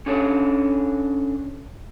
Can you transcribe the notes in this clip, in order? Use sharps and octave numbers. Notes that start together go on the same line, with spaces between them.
C#4 D4 A4 C#5